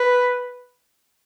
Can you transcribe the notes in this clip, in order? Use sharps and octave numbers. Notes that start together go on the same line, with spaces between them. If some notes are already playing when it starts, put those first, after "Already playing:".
Already playing: B4